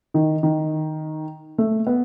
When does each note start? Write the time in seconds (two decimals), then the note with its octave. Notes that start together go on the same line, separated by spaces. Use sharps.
0.14 D#3
0.43 D#3
1.58 A3
1.87 B3